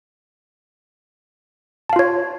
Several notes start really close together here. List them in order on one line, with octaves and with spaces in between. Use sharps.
A5 F5 F4 C#5